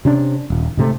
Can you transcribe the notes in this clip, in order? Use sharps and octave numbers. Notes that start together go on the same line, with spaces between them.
C3 C#4 D4
D#1
G#2 C3 A3